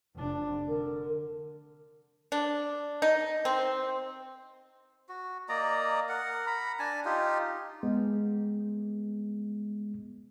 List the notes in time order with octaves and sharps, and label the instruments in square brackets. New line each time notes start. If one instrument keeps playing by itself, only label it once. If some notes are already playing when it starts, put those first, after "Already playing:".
[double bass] F1 D4
[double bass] D3 [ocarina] A#4
[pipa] D4
D#4
C4
[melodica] F#4
A#3 D5 D#5 A#5
A#4 F#5
A#5 B5
D4 G#5 A5
D#4 F4 G4
[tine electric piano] G#3 B3